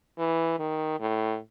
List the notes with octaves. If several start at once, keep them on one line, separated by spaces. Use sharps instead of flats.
E3
D#3
A2